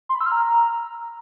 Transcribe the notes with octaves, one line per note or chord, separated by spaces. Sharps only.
C6
B5
E6
F6
A#5